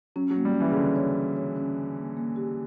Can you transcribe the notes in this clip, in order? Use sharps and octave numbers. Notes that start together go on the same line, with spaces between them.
F#3 C#4
F#3
A#3
G3
C#4
E3
C#3
D3 C#4
C#5
C#4
C#5
C#4
C#4
A#3
A#3
G4